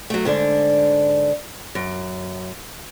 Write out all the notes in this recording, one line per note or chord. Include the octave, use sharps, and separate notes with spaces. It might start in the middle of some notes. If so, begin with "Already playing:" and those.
F#3 A3
G#2 D3 D4
F#2